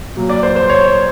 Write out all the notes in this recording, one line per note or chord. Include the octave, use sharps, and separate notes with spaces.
A#2 F#3
D5
C5
C5
C#5
C#5